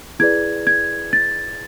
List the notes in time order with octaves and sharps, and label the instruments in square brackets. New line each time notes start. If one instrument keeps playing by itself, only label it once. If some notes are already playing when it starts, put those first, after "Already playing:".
[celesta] E4 G#4 B4 D5 G#6
G#6
A6